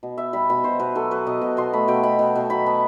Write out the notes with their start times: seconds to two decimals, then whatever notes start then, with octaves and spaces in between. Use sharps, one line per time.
0.03 B2
0.18 B3 E5
0.33 G3 B5
0.50 B2 B5
0.64 B2 C5
0.79 B2 B4
0.95 F#3 A4
1.11 F#3 B4
1.26 B2 D#5
1.41 B2
1.57 B2 C6
1.73 A3 B5
1.88 B2 G5
2.03 B2 B5
2.19 B2
2.35 B2
2.50 F#3 B5
2.66 B3 A5